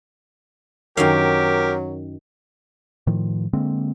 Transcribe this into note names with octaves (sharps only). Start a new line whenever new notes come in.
F#2 D#3 F#3 G4 A#4 F5
A2 D#3 F3
D3 G#3 A#3 C4